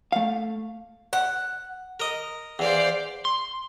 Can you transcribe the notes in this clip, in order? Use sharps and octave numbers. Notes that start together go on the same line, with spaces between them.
A3 F5
F#5
A#4 D#5
E2 C5 D5 F5
C6